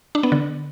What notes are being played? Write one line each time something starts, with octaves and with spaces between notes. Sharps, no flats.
D4
B3
D3